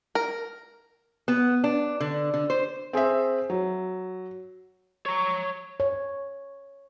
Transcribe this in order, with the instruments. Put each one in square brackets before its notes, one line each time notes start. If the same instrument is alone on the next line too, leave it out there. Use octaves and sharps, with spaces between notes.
[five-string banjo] A#4
[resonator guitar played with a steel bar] B3
D4
D3
D3
C5
[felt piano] C4 G#4 C5 E5
F#3
[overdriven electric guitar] C#5 A#5 [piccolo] C#6
[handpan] C#5